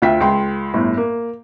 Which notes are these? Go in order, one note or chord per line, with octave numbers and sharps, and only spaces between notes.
D2 F4 E5 G5 B6
C#2 G5 C6
G1 A2
A#3